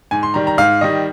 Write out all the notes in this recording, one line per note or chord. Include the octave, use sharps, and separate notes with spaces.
G#2 G#5
C6
D#3 G3 A#5
A#5
G#2 F5
D#3 G3 D#5